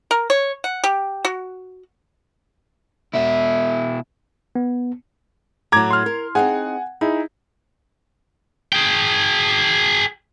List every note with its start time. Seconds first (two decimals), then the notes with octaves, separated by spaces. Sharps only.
0.11 A#4
0.30 C#5
0.64 F#5
0.84 G4
1.25 F#4
3.14 B2 E4
4.55 B3
5.72 A2 F#3 A#5 D6 G#6
5.91 C6 F6
6.06 A#4
6.35 C4 D#4 G#4 F#5 G#5
7.01 D#4 E4 G#4
8.73 G#4 G5